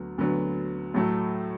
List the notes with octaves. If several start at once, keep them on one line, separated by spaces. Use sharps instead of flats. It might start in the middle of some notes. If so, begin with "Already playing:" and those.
Already playing: D2 F#3 B3
D2 D3 F#3 B3
A2 F#3 A3